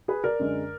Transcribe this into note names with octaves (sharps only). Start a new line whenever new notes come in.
G#4 B4
A#4 D5
F#2 D3 G#3